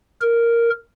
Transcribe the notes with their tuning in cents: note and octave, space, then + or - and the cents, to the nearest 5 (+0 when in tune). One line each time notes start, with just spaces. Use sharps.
A#4 -5